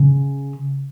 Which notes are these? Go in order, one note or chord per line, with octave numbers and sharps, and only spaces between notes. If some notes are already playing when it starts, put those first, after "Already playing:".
Already playing: C#3